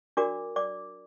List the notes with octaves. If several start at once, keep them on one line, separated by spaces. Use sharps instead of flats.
D4 F#4 A#4 D5 D6
D5 D6